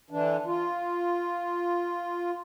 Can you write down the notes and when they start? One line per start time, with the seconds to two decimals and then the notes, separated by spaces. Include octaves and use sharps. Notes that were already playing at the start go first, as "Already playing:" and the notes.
0.11 D3 E3 D4
0.46 F4